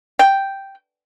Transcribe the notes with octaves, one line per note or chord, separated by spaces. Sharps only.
G5